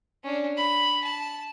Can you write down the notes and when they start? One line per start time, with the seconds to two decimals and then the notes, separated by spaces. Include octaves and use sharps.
0.24 C#4 D4
0.57 B5
1.04 A5